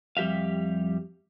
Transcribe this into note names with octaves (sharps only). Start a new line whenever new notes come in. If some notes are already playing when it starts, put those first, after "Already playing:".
F2 G3 G4 E5 F5